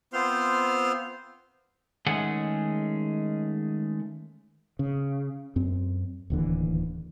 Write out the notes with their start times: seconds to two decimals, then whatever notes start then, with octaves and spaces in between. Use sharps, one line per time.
0.13 B3 C4 F4 C5 C6 F6
2.07 D#3 G#3 A3 C#4 G#4 F#5
4.79 C#3
5.56 F#2 C4
6.30 D1 D#2 D3 E3